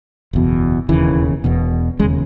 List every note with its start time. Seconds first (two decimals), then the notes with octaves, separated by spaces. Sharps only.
0.33 F#1 E2 B2
0.89 E1 D#2 C#3 E3
1.44 E1 E2 B2
1.99 E1 D#2 C#3 G#3